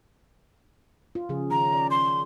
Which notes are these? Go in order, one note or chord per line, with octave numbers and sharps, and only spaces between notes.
F4
C#3 F3 G#4
D#3 C#4 A#5
D5
C6